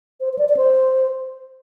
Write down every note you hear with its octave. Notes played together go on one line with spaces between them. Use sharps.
C5
C5
D5
D5
C5